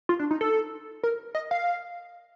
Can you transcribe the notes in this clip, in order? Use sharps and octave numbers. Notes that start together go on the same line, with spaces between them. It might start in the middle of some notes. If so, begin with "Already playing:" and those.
F4
D4
D#4
A4
A#4
D#5
F5